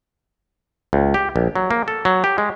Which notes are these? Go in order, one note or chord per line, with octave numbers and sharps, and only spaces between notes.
C#2
G4
A#1
F#3
A#3
A4
F#3
G4
G#3